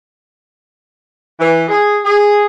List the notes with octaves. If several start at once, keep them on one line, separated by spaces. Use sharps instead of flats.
E3
G#4
G#4